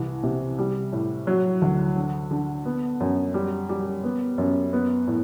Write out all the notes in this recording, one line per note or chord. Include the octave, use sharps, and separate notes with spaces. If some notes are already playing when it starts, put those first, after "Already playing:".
Already playing: C2 E3
C3
G3
A2
F#3
D2
D3
D3
B3
F#2
G3
G3
B3
F#2
B3
A2